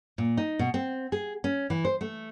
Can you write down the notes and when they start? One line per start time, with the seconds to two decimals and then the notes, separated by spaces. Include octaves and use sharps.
0.18 A#2
0.37 D#4
0.59 B2
0.74 C4
1.12 G#4
1.44 C#4
1.70 E3
1.85 C5
2.01 A3